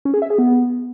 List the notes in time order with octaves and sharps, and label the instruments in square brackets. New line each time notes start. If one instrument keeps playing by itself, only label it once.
[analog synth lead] C#4
G#4
E5
G#4
B3